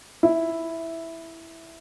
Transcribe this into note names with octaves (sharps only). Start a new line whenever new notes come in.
E4